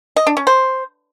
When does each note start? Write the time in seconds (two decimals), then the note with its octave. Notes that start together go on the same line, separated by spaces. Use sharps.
0.16 D#5
0.27 D4
0.37 C#4
0.47 C5